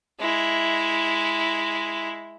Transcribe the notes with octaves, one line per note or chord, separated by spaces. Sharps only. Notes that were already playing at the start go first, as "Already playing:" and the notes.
G#3 E4